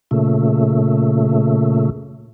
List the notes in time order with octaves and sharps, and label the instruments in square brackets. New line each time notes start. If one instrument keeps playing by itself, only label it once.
[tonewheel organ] A#2 C#3 A3